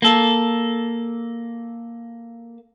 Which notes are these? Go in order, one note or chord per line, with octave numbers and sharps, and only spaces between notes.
A#3 A4